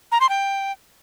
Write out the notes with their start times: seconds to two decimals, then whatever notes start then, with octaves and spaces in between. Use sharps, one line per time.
0.12 A#5
0.20 C6
0.29 G5